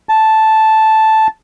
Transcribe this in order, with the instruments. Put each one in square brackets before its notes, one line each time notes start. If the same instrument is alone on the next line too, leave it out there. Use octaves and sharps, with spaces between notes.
[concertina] A5